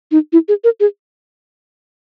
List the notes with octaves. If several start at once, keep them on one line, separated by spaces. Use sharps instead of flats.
D#4
E4
G#4
A#4
G#4